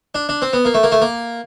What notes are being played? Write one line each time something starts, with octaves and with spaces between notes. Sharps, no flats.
D4
D4
C4
B3
A#3
A3
A#3
A3
A#3